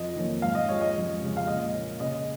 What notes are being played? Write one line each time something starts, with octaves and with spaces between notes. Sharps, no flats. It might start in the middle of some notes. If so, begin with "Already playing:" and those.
Already playing: F2 D#5
D#3 A#3 C#4
G#2 F5
D#5
F3 G#3 C#4 C#5
D#5
F2
C#3 G#3
F5
A#2 D#5
A#3 C#4
C#3 D#5